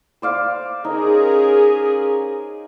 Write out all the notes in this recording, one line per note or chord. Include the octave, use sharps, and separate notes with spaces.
C5 D5 F5
C#4 D#4 G#4 A#4